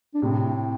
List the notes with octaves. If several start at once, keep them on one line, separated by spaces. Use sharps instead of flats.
D4
A2 C3 C4